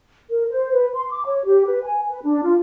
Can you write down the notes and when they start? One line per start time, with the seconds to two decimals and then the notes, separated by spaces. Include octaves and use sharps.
0.30 A#4
0.49 C5
0.72 B4
0.93 C6
1.09 D6
1.25 C#5
1.45 G4
1.66 B4
1.84 G#5
2.09 B4
2.23 D4
2.43 F4